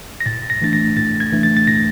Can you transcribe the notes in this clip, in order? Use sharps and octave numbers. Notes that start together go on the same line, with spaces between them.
A#6
A2 A6
A#6
E3 A3 D4 A6
A#6
A2 A6
G#6
E3 A3 D4
A6
A6
A2 A#6